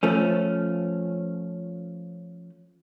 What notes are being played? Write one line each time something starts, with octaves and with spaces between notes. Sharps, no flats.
F3 A3 C#4